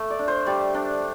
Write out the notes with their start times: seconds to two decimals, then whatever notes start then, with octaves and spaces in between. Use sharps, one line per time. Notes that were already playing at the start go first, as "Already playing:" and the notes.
Already playing: A3
0.10 D5
0.19 D4
0.28 C5
0.46 G3 D5
0.74 D4